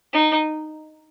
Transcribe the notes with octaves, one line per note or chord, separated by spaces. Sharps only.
D#4